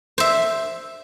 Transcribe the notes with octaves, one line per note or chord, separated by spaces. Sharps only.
C5 E5